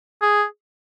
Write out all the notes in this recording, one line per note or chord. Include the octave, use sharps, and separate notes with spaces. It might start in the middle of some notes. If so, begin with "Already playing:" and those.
G#4